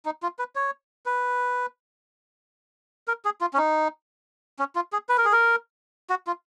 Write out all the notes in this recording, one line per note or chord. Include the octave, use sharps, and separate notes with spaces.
D#4
F4
B4
C#5
B4
A#4
G#4
F4
C#4
D#4
C#4
F4
G#4
B4
A#4
G#4
A#4
F#4
F4